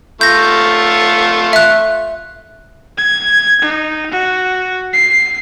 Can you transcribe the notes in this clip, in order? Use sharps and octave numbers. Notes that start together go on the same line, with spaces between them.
A3 F4 G6 A#6
E5 F#6
G#6
D#4
F#4
C7